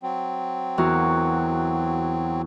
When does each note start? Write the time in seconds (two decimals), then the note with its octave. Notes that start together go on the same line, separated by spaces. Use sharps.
0.03 F#3 C4
0.78 E2 F#4 A#4